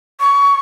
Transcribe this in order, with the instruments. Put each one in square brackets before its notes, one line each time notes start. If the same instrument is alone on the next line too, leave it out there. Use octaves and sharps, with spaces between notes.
[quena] C#6